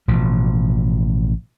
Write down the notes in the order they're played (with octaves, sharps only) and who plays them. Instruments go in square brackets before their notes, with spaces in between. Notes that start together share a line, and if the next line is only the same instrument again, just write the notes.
[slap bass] A1 B2 F3